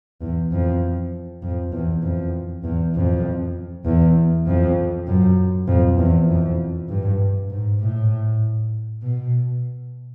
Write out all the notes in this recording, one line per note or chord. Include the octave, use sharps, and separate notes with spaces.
E2
F2
F2
E2
F2
E2
F2
E2
F2
F#2
F2
E2
F2
G2
G#2
A2
B2